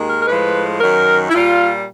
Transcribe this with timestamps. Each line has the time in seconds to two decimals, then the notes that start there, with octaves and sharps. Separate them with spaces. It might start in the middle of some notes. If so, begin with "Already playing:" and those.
Already playing: D#2 D#3 G#3
0.10 A#4
0.21 A#4
0.27 A2 F3 G#3 B4
0.80 F#2 D#3 F#3 A#4
1.29 E4
1.33 A#2 G3 F4